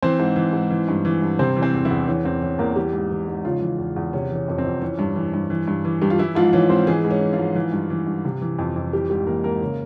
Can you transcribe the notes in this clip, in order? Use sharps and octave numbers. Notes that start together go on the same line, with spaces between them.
E3 C4 C5
G#2
E3
G#2
E3
G2
E3
G2
C3 C4 C5
E3
C4 C5
E2
E3 E4
E2
E3 C#4
E2 C4
E3 C#4
E2 A#3 A#4
E3 G3 G4
G#2
E3
G#2
C#3 F3 F4
E3
E2
E2
C3 C#4
E3
C#4
F2 C#4
C4
F2
E3 C#4
G2
E3
G2
E3
G2
E3
G2 G4
F4
E3 E4
G#2 F3 F4
E3 C#4
G#2 C4 C5
E3 G#3 G#4
G#2
C#4
E3
F3 F4
G#2
E3
G2
E3
G2
C3
E3
F2
F2
E3 G3 G4
G#2 G3 G4
E3 A#3 A#4
G#2 A#3 A#4
C#3